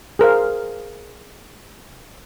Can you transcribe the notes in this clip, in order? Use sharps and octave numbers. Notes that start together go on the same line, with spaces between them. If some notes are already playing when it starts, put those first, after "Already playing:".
G#4 A#4 C5 F5